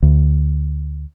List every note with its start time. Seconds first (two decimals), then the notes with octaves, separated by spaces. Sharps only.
0.03 D2